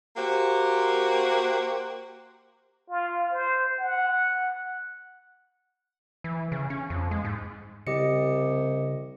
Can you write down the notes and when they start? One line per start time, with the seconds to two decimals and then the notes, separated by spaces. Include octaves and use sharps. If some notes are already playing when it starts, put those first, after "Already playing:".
0.17 A#3 F#4 G4 C5
2.90 F4
3.32 C5
3.80 F#5
6.24 E3
6.52 C#3
6.70 C#4
6.90 F2
7.11 G#3
7.25 G#2
7.87 C2 C#3 G4 D#5 C#7